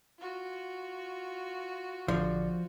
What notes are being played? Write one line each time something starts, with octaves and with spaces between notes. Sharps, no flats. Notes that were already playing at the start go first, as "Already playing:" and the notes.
F4 F#4
A1 D3 F3 D5